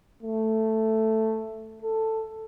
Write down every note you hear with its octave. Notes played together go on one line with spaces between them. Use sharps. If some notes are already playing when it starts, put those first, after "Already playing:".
A3
A4